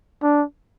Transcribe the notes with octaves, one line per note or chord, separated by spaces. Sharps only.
D4